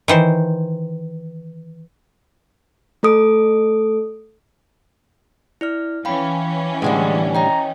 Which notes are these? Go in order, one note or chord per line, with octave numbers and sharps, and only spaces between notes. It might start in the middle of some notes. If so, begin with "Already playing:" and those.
D#3 E3 C5
A3 A4 D#6 D7
E4 D5 F6
E3 C#4 F5 G5 B5
A2 D3 G3 G#3
C#5 D#5 G5 A#5